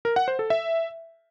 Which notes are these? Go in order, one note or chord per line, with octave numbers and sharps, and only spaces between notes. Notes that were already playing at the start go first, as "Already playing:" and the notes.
A#4
F#5
C5
A4
E5